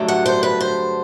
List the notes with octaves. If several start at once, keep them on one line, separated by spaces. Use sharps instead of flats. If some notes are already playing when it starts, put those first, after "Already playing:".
Already playing: G2 D3 F#3 A3
F#5
C5
B4
C5